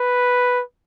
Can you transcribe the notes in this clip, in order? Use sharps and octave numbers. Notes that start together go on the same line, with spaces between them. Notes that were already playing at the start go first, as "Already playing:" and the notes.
Already playing: B4